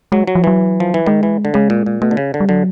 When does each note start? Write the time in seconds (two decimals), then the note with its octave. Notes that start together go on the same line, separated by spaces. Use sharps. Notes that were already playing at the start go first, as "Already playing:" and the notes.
0.12 F#3 G#3
0.27 F#3
0.35 F3
0.44 E3 F#3
0.80 F3
0.94 E3
1.06 D#3 G#3
1.23 E3
1.45 D3
1.54 C#3 G#3
1.70 A#2
1.86 A#2
2.02 B2 A3
2.11 D3
2.17 C#3
2.34 D3
2.40 G3
2.49 D3 F#3